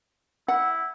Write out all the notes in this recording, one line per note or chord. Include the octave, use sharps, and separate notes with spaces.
E4 F#5